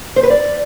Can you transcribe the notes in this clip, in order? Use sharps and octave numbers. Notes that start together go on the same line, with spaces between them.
C5
B4
D5